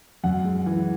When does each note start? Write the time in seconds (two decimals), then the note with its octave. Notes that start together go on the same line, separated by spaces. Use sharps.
0.24 F#2 F#5
0.45 G#3
0.66 E3